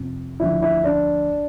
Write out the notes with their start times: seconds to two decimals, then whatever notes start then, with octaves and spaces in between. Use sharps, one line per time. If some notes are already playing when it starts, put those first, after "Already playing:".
Already playing: F2 C3 F3
0.40 D2 D3 F3 E4
0.62 E4
0.84 D4